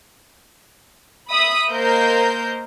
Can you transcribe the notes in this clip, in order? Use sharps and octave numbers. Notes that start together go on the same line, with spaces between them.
E5 B5 D#6
A#3 A#4 C5 D#5 G6